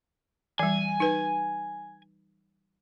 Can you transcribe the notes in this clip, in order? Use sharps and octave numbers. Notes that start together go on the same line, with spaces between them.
E3 G3 G#5
D#4 B4